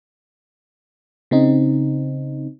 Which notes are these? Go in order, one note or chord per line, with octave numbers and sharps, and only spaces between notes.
C#3 C4 D#4